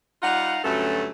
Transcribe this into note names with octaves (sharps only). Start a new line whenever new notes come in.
G3 D#4 F4 F5 F#5
D2 G2 F#3 A3 C#4 A4